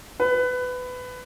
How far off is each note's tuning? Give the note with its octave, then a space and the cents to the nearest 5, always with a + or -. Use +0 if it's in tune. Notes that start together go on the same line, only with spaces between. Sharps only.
B4 +20